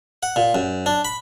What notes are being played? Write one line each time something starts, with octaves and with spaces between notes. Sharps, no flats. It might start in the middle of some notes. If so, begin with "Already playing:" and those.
F#5
A#2
F#2
D4
B5